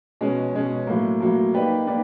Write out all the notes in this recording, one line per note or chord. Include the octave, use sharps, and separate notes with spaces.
B2 G#3 C#4
B2 G#3 C#4
A2 F#3 A#3
A2 F#3 A#3
A#3 D#4 G4 B4 D5
A#3 D#4 G4 B4 D5